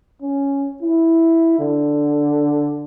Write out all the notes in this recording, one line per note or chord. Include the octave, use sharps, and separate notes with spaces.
C#4
E4
D3